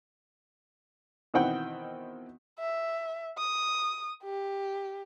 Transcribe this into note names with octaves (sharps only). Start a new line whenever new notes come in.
B2 D#3 E3 C4 F#5 G5
E5
D#6
G4